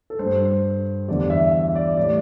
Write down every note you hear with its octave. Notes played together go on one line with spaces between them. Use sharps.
A4
G2 G3 C5
E2 D3 G3 D5
E5
E5
D5
A2 G3 D5